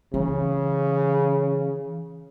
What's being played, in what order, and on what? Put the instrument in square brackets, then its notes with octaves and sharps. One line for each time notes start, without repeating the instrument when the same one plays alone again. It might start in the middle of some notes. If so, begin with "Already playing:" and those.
[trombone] C#3 [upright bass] E3